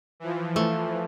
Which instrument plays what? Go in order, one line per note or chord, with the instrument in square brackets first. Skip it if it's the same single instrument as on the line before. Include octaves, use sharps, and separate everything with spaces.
[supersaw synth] E3 F3
[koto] A3